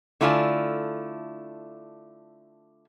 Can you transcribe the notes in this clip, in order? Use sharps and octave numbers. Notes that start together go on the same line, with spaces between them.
D3 A3 E4 F4 D5 G#5